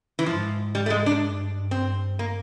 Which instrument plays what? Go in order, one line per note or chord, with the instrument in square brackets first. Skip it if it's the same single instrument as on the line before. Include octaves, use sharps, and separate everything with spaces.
[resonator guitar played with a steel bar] E3
[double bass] G#2 [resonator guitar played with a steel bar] F3
[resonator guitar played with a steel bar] G3
A3
G#3
D4
[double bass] G2
[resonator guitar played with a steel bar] C4
A#3